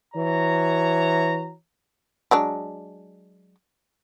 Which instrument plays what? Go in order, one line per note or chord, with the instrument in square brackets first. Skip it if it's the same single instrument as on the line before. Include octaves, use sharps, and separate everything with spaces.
[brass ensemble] E3 F#4 C#5 A#5
[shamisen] F#3 G#3 D4